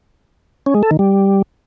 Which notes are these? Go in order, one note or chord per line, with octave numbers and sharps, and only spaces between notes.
C#4
G#3
A4
D#3
G3